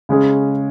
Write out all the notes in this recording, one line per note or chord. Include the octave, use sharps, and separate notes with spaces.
C#3 G#3 C#4 G#4